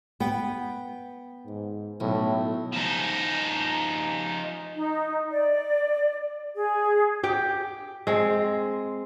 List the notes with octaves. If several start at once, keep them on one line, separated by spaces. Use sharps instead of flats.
B3 G5
G#2
B1 A2
F3 D#4
D#4
D5
G#4
G4 G5
G#3 C4